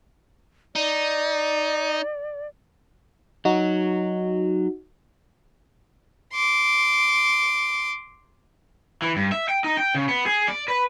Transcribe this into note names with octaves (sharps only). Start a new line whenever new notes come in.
D#4 D5
F#3 D#4 F#4
C6 D6
E3
G2
E5
G5
D#4
G5
C#3
B3
G#4
D5
B4